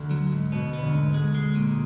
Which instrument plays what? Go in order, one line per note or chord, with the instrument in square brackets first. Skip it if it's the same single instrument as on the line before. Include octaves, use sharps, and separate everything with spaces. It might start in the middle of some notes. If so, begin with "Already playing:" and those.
Already playing: [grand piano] D2 D3
[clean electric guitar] F#3
G#2
[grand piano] B2 [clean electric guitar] B3
[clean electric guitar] B3
[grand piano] D2 D3
[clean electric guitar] G#2
G#3
G#3
A#2